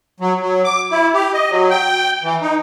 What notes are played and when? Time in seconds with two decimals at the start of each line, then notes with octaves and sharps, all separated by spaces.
0.20 F#3
0.41 F#3
0.64 D6
0.91 E4
1.13 G4
1.34 D#5
1.50 F#3
1.70 G5
2.23 E3
2.41 D#4